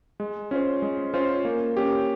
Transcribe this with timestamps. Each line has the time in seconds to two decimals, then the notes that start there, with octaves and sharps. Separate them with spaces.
0.20 G#3
0.51 C#4 F4 C5
0.82 G#3
1.14 C#4 F4 C5
1.45 A#3
1.77 C#4 G4